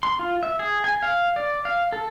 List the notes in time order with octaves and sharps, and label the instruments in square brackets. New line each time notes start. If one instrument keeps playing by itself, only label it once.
[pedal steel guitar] C6
F4
E5
G#4
G#5
F5
D5
F5
A4